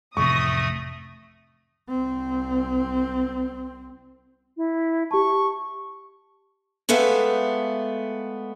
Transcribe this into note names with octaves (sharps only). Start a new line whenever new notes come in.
A1 F2 C3 A3 C#6 D#6 A#6
C2 C4
E4
G4 A5 C#6
G#3 A3 B3 A4 E5 F5